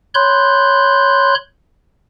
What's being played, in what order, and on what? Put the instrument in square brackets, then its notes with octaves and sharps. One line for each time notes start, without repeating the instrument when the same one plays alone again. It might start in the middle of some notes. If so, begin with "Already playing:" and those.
[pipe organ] C#5 B5 C6 F#6 G6